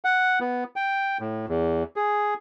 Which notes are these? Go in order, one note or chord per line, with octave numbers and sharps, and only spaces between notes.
F#5
B3
G5
A2
E2
G#4